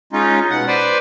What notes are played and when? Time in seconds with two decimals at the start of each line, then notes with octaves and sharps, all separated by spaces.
0.13 G#3 C#4 D#4 F4
0.50 B2 F#5
0.67 B4 C5 D5